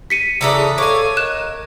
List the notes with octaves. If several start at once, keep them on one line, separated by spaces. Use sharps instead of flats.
B6 C#7 D#7
C#3 E3 D4 A4 E5 A#5 B5 D#6
A4 C#5 F5 G#5 C#6 D6
A#4 D#5 F#6 E7